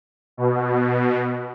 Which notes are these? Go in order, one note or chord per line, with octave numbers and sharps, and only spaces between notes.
B2